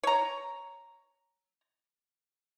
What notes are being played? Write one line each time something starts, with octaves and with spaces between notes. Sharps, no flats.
C#5 A#5